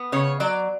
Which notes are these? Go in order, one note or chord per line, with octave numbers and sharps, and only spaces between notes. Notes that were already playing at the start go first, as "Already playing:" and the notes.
Already playing: B3
C#3 C#5
F#3 D5